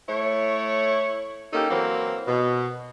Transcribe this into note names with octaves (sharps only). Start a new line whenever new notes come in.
A3 E4 C#5
A#3 C#4 D#4 G4 A4
E3 F#3 A#3 C4
B2